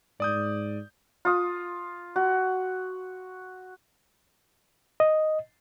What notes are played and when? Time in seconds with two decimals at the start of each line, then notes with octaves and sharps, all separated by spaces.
0.20 G#2 D5 D#6 G6
1.25 F4 D#6
2.16 F#4
5.00 D#5